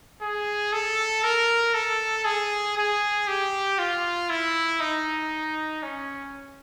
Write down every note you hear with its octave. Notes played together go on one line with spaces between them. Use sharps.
G#4
A4
A#4
A4
G#4
G#4
G4
F4
E4
D#4
C#4